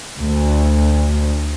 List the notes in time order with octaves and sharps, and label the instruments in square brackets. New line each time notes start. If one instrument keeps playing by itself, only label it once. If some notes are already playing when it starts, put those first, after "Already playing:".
[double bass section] D2